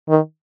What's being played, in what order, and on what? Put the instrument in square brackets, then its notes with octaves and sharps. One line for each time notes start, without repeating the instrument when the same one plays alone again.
[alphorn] D#3